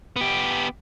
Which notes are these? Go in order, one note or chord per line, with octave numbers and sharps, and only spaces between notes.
B3 G4